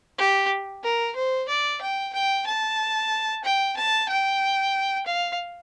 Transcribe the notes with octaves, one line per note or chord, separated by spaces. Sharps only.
G4
A#4
C5
D5
G5
G5
A5
G5
A5
G5
F5